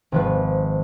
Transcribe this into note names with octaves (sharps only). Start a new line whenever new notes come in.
G#1 F3 B4